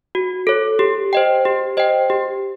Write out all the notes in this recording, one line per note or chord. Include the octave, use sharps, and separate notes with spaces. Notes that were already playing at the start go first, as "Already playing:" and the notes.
F#4
A4 C#5
G4
C5 D#5 G5
G4
C5 D#5 G5
G4